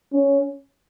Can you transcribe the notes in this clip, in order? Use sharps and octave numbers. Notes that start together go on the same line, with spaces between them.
C#4